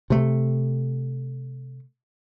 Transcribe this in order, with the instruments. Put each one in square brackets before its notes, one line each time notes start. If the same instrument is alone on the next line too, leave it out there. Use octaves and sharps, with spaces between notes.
[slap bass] C3 A3